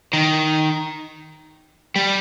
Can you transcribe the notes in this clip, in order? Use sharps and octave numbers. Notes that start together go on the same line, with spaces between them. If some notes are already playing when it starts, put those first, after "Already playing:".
D#3
G3